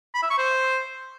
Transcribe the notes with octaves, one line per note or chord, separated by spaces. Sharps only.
B5
E5
C#6
C5